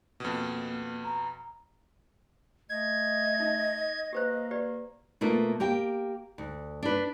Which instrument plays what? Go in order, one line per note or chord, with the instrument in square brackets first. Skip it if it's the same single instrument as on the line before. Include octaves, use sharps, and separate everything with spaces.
[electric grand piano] F2 B2 [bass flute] A#3
[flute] A#5
[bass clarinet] A3 [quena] D#5 [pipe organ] G#6
[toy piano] D#4
[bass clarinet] A#3 [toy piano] G4 B4 C5
[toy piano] G4 B4 D5
[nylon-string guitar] B2 A3 A#3 F4
A#3 G4 G5
D2
D4 B4